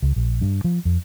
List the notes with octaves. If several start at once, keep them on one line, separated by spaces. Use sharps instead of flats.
C#2
A#1
G2
F3
F2